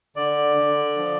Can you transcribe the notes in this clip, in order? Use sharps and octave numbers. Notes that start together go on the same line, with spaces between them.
D3 D5
D3
F3